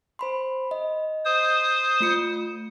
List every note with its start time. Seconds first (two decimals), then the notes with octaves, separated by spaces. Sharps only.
0.19 C5 B5 C6
0.71 D#5
1.25 C5 D#6
2.00 A3 F4 C#7